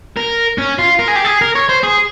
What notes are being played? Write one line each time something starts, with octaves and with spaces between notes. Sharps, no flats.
A#4
C#4
F4
A#4
G#4
G4
G#4
A#4
C#5
C5
G#4